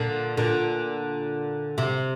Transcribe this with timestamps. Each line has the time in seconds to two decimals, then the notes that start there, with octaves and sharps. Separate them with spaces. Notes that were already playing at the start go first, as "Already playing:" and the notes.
Already playing: A#2 D3
0.37 A#2 D3
1.78 C3